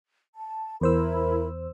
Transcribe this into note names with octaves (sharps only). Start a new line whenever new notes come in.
A5
E2 E4 A#4 C5 B5 E6